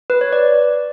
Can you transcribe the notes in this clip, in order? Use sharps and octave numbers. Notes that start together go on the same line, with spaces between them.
B4
C#5
D5